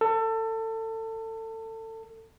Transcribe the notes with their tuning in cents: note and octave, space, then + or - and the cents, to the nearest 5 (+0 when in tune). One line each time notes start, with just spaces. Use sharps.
A4 +25